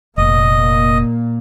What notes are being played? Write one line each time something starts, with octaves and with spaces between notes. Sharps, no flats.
F1 A#2 A#3 D#5